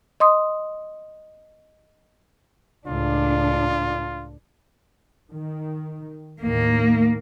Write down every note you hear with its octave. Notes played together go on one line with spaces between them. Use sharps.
D#5 C6 D#6
C#2 A2 D4 F4
D#3
D#2 A2 D#3 A#3